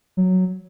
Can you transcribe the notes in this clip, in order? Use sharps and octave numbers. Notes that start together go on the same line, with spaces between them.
F#3